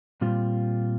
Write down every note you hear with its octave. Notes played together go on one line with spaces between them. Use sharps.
A#2 G3 C4 F4